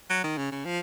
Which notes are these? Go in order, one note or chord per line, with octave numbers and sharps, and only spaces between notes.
F#3
D#3
C#3
C#3
F3